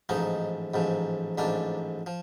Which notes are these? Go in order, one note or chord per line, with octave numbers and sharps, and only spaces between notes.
A1 G#2 F3 D#4
A1 G#2 F3
A1 G#2 F3 D4
F3